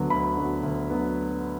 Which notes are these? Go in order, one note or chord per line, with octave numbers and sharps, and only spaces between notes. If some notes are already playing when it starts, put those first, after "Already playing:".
Already playing: D2 D3 F#3 B3
D2 B5
D3 F#3 B3
D2
D3 F#3 B3